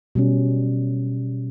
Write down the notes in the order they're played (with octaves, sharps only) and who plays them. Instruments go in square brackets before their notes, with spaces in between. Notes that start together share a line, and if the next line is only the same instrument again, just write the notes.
[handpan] B2 G3 C#4